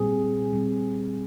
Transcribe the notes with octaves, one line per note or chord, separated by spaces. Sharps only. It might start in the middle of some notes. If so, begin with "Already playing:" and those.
Already playing: A#2 G3 C4 G#4
A#2 G3 C4